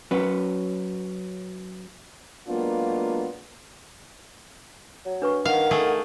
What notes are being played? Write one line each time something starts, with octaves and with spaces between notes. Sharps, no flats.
F#3 C#4 B4
F#3 G#3 A#3 B3 D4 F4
F#3
D4 B4 C#6
D#3 F5 F#5
A3 G#4